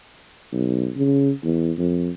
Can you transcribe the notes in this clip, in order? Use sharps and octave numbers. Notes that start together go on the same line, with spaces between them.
B1
C#3
E2
F2